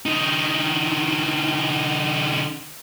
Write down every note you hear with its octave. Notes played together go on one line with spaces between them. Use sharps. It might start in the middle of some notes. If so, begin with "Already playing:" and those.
D3 D#4